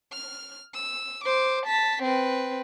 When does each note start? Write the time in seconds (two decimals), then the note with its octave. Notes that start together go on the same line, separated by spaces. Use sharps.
0.13 F6
0.74 E6
1.24 C5 D6
1.66 A5 B6
2.03 C4 B4